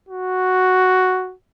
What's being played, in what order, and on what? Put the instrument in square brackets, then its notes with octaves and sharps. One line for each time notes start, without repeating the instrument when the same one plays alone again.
[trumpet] F#4